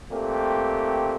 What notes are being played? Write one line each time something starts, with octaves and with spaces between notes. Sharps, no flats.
A#2 A3 C4 G4